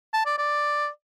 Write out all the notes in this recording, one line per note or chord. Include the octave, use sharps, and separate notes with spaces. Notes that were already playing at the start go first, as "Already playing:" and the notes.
A5
D5
D5